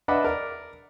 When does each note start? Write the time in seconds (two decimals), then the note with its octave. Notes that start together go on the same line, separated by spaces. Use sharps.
0.08 D4 B4 D#5 E5 F#5 B5
0.24 A#4 D5